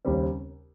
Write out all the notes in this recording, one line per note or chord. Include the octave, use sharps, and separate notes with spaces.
D#2 C#3 G3 C4